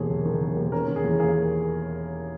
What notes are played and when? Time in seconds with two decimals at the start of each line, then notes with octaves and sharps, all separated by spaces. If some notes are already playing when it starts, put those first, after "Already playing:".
Already playing: E1 D#2 G#4
0.10 E1
0.26 D#3
0.41 E1
0.57 D#2
0.72 C#4 A#4
0.88 D#3
0.96 G#4
1.04 E2
1.20 A#3 G#4